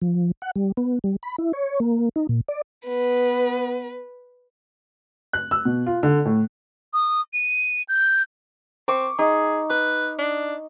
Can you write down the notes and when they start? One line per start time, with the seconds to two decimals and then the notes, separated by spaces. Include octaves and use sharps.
0.02 F3
0.42 F#5
0.56 G3
0.77 B3
1.04 G3
1.23 B5
1.38 E4
1.53 C#5
1.80 A#3
2.16 D#4
2.29 A#2
2.48 D5
2.86 B3 B4
5.33 F#6
5.51 E6
5.65 B2
5.86 F4
6.03 D3
6.25 A2
6.93 D#6
7.33 D#7
7.89 G6
8.88 C4 C#6 D6
9.19 D#4 G#4
9.70 B4 D#6
10.19 D4